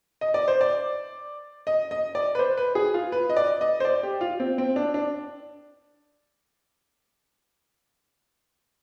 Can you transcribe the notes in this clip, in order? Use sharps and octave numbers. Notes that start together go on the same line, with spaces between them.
D#5
D5
C5
D5
D#5
D#5
D5
B4
C5
B4
G#4
F4
B4
D#5
D5
D#5
C5
D5
G4
F4
C4
C4
D4
D4